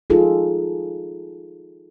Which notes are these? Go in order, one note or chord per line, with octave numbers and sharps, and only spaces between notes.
D#4 F4 G#4 A4